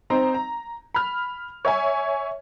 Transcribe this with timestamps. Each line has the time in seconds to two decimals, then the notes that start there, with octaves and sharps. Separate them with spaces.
0.10 C4 D#4 C5 A#5
0.34 A#5
0.94 B5 F6
1.65 C#5 E5 G#5